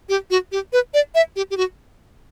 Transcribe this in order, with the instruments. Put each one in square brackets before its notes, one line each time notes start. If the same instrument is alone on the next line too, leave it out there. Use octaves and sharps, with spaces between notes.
[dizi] G4
F#4
G4
B4
D5
E5
G4
G4
F#4